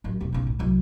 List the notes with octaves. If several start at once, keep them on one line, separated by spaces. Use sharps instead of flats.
A1 F#2
E1 C3
B1 C#3
A2
C2 F#3